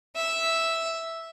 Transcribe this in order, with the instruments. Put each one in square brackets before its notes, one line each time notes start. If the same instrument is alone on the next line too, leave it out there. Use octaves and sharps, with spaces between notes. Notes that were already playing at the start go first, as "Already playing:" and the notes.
[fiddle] E5